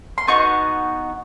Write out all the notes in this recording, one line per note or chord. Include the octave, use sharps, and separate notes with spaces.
C6
B3 D#4 F#4 C#6